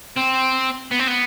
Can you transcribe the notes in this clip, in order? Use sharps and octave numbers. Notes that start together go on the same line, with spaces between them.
C4
B3
C4
B3